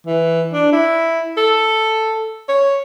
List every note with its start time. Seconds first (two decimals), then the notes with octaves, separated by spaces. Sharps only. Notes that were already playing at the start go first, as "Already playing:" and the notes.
0.07 E3
0.53 D4
0.72 E4
1.37 A4
2.48 C#5